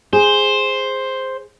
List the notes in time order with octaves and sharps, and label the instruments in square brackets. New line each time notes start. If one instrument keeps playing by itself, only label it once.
[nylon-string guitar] G#4 [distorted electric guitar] C5